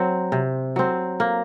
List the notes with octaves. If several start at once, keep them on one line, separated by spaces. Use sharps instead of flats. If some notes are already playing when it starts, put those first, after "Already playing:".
Already playing: F#3 C4
C3
F#3 C4
A#3